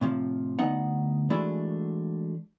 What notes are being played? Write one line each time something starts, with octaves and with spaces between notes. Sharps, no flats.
A2 C3 F3
D2 B3 D#4 F#5
E3 G#3 A3 D4 E4 F#4